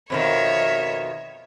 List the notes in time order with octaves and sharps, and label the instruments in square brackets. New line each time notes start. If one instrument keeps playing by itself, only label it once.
[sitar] F2 B2 D#3 [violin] C#5 E5